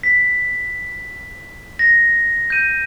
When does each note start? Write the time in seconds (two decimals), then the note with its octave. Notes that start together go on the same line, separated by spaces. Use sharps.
0.03 B6
1.79 A#6
2.50 G6 D#7